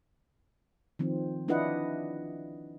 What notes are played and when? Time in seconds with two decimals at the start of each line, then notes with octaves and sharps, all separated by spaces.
0.99 D#3 F3 C4
1.48 D4 E4 F4 B4 D#5 F#5